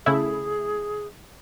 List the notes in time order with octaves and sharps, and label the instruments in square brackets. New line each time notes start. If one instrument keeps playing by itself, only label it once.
[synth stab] C#3 A3 E4 [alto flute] G#4